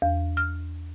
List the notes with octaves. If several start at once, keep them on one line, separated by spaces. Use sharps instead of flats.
E2
F6